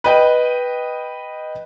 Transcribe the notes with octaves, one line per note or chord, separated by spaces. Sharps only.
B4 D#5 G5